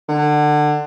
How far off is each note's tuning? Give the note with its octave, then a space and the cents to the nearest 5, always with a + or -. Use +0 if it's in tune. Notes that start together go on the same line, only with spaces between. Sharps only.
D3 +25